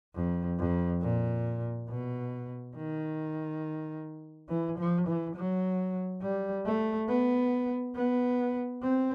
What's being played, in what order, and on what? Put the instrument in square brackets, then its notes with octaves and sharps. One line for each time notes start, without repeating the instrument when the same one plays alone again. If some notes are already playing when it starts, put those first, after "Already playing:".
[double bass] F2
F2
A#2
B2
D#3
E3
F3
E3
F#3
G3
A3
B3
B3
C4